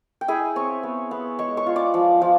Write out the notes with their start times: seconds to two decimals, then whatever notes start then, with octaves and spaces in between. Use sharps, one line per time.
0.21 G5
0.28 E4 G#4 G#5
0.56 C4 C#5 C#6
0.83 B3
1.11 B3
1.39 G#3 C#5 C#6
1.57 C#5 C#6
1.66 F4
1.76 D5 D6
1.94 F3
2.22 F3